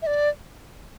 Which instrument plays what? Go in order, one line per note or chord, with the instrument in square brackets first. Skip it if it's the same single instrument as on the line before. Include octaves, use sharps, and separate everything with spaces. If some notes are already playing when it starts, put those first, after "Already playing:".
[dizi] E5
D5